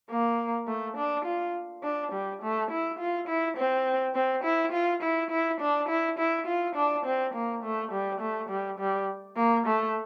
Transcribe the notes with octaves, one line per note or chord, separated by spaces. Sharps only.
A#3
A3
D4
F4
D4
G3
A3
E4
F4
E4
C4
C4
E4
F4
E4
E4
D4
E4
E4
F4
D4
C4
A#3
A3
G3
A3
G3
G3
A#3
A3